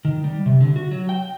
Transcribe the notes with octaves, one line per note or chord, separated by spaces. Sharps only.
D#3
G3
C3
D3
F#4
F#3
G5
G5